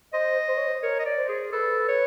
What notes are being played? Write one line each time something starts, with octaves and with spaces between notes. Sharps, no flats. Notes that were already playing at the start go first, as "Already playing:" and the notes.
C5 D#5
C5
C#5
C5
A#4 C#5
D#5
D5
C5
G#4
A4 B4
C#5